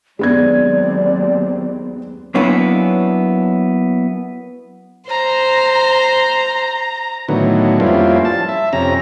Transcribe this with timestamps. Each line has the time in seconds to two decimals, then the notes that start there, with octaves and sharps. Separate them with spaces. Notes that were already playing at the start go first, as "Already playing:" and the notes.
0.19 D#2 F#3 G#3 B3 C4 D5 G#6
2.35 F#3 A#3 B3 C#4 D4 E4
5.09 C5 A#5
7.28 A2 D3 D#3 F#3 B3
7.80 F2 G3 A#3 C#4 E4 F4
8.25 A5
8.49 E5
8.73 F2 C3 C#4 A#5